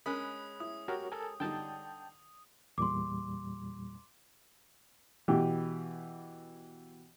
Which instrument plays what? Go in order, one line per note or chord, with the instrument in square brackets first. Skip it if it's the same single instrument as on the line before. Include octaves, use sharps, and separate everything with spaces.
[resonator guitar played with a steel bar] G#3 C#4 [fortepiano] A#4 [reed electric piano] B5 F#6 [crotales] D#6
[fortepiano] E4 [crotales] D#6
[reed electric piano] F#4 A#4 C#5 [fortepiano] G4
[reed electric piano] A4 A#4 G#5
[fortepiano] D3 G3 D#4 [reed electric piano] G5 A5 G6
[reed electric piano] E2 A#2 G3 [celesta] C6 D6
[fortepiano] B2 E3 G4